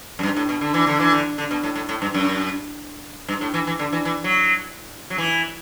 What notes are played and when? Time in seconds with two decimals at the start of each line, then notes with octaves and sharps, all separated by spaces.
0.19 F#2
0.23 G2
0.36 A2
0.49 B2
0.61 D3
0.74 E3
0.87 D3
1.00 E3
1.12 D3
1.38 D3
1.51 B2
1.64 A2
1.76 A2
1.89 A2
2.02 G2
2.14 F#2
3.29 G2
3.41 A2
3.54 E3
3.67 E3
3.79 D3
3.93 E3
4.05 E3
4.24 F#3
5.10 F#3
5.18 E3